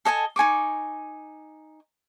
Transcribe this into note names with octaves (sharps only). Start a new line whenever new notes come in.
A4 D#5 G#5 A5
D#4 G#5 C#6 D6